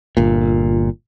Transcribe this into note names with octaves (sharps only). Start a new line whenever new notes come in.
G1 A#2